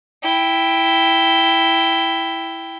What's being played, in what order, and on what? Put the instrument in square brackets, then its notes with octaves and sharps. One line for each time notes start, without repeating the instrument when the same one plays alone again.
[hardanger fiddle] E4 G5